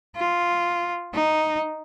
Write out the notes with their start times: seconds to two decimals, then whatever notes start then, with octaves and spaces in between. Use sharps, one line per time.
0.17 F4
1.14 D#4